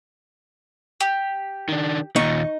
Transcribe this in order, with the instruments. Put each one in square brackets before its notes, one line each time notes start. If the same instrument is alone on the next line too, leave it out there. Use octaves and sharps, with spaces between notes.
[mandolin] G4
[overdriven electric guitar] D#3 D4
[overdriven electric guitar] D#2 A#2 [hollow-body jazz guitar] D#4 [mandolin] C#6